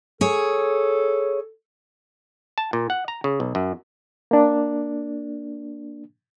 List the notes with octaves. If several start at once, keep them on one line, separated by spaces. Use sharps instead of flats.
G#4 A4 C#5
A5
A#2
F#5
A#5
C#3
B1
F#2
A#3 D4